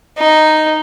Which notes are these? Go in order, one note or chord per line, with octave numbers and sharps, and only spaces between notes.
D#4